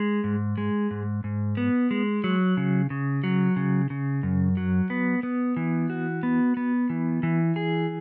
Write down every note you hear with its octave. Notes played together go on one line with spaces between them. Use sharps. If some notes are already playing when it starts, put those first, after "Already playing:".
Already playing: G#3
G#2
G#3
G#2
G#2
B3
G#3
F#3
C#3
C#3
F#3
C#3
C#3
F#2
F#3
B3
B3
E3
F#4
B3
B3
E3
E3
G#4